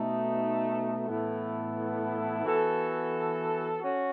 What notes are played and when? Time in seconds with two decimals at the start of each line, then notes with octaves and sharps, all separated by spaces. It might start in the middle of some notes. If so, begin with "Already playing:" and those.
Already playing: B2 A3 D#4
1.06 A2 E3 B3 E4 A4
2.44 E3 B3 F#4 A4
3.81 C#4 F#4